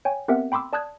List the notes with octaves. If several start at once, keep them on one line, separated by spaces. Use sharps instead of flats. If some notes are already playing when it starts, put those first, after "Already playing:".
C#5 G5 G#5
B3 C4 G4 A#4 E5 F#5
G5 B5 C6 D6 E6
D5 A5 D#6 F#6 G#6